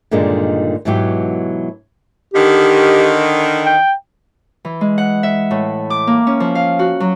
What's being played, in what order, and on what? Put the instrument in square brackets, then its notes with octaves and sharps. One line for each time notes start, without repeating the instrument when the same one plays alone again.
[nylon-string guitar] G2 A#2 D3 D#3 G#3
G#2 B2 E3 F#3 G4
[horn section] D3 D#3 [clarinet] G4
[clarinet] G5
[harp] E3
G#3
F#5
E5
A2
D6
A#3
C#4
F3
F5
F#4
F#3